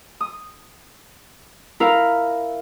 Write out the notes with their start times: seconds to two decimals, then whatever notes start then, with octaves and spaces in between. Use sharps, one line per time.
0.20 D#6
1.80 E4 A#4 F5